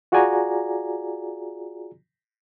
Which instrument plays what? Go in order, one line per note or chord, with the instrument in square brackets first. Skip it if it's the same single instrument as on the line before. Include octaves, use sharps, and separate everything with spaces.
[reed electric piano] F4 F#4 G#4 D5 G#5 A#5